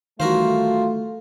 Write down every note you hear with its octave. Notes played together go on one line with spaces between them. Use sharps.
D#3 E3 G3 A3 F4 F#4 A#4 C5